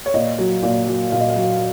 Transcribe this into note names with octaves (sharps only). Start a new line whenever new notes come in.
C#5
A#2 D#5
F#3
A#2
F#3
A#2 F5
D#5
F5
F#3